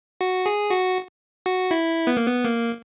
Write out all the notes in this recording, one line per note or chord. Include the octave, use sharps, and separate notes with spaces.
F#4
G#4
F#4
F#4
E4
B3
A#3
B3
A#3